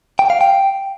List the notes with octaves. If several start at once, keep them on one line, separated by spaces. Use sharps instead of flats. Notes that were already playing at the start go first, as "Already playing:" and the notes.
G5
F5
G5